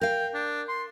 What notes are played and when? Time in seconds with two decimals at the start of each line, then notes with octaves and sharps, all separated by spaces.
0.01 A#4 F5 G5
0.34 D4
0.69 C6